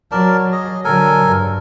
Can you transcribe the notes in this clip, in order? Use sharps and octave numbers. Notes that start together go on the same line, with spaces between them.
F#3 A#4 D5 A5
G#4 D#5
D3 F#3 A4 A#4 G#5
G2